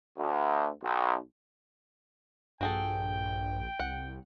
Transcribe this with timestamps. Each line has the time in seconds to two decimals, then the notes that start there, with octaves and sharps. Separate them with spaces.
0.16 D2
0.83 B1
2.61 A#1 G2 F#4 G#4 A4 G5
3.79 C2 F#5